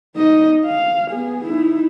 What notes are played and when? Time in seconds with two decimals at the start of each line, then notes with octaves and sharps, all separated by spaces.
0.17 D#4 D#5
0.66 F5
1.10 B3 G#4
1.45 D#4 E4